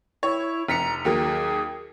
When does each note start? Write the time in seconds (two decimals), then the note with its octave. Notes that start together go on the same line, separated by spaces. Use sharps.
0.23 E4 C#5
0.68 F1 A#5 B6 C#7
1.05 D#2 F#3 A#3 G#4